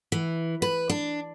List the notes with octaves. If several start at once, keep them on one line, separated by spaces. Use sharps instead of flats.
E3
B4
D4